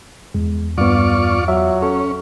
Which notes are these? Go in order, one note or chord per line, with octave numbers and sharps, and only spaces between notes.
E2 G#3
G2 B3 F4 D5 C#6
F#3 E5
C#4 A4